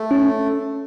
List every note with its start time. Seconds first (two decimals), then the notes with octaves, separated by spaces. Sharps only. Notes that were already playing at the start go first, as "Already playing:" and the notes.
Already playing: A3
0.11 C#4